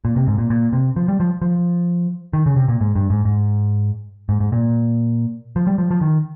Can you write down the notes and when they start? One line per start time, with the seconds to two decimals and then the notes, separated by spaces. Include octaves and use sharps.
0.05 A#2
0.16 C3
0.27 G#2
0.38 A#2
0.50 A#2
0.73 C3
0.96 F3
1.08 G3
1.20 F3
1.42 F3
2.33 D#3
2.46 C#3
2.56 C3
2.68 A#2
2.81 G#2
2.95 G2
3.10 G#2
3.25 G#2
4.29 G#2
4.40 G#2
4.52 A#2
5.56 F3
5.67 G3
5.78 F3
5.91 F3
6.01 D#3